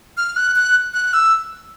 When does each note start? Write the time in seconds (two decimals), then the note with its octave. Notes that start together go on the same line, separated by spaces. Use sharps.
0.17 F6
0.36 F#6
0.56 F#6
0.94 F#6
1.14 E6